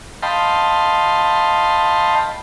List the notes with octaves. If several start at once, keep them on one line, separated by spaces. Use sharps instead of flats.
D#5 F5 G5 A5 B5 C6